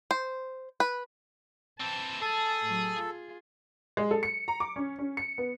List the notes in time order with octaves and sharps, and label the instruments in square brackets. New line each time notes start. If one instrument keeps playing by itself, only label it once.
[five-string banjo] C5
B4
[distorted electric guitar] E3 C4 [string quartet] A5 E6
[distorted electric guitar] G#4 [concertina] A4 [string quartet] A5
[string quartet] A2 F#3
F4 G#4
[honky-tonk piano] G#3
A4
C#7
A#5
D6
C#4
C#4
C#7
B3